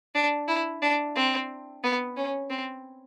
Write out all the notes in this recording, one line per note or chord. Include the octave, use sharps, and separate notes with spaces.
D4
E4
D4
C4
B3
C#4
C4